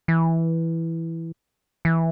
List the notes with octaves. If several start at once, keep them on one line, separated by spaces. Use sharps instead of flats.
E3
E3